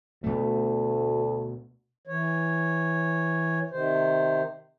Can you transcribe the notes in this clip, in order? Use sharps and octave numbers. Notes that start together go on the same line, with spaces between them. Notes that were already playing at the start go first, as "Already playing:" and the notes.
D2 B2 A3
E3 C#5
C3 D#3 C5